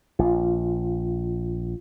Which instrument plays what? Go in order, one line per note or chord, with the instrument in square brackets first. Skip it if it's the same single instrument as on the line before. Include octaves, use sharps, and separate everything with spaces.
[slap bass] A#1 [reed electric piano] F4